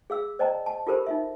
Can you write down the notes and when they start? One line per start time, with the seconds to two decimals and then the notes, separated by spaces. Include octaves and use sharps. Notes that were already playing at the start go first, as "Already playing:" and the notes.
0.10 G#4 F5 E6
0.39 C5 D5 D#5 G5 A5 A#5
0.66 A5
0.87 F4 G4 A4 A#4 C5 B5
1.07 D#4 F4 E5